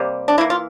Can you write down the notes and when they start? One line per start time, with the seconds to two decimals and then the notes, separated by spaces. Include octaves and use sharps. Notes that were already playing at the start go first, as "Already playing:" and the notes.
Already playing: C3 G3 A#3
0.28 D4
0.38 E3 E4
0.41 A#3
0.50 F4